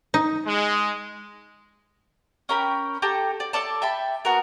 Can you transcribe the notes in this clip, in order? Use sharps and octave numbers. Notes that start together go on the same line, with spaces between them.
D#4
G#3
C#4 A#4 G5 B5
G4 A4 A5 A#5
D5
A4 C#5 D5 A5
E5 G5 A5 B5
B3 F#4 A#4